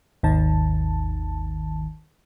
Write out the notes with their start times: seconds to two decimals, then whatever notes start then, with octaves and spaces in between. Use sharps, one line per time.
0.23 G#1 D#2 D#3 A5